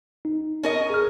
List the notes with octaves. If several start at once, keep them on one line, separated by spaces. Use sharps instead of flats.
D#4
C#4 A#4 D#5
G#4 F6